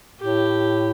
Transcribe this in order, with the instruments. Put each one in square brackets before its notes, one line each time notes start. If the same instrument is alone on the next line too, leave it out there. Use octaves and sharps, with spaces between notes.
[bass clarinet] A2 [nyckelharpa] G4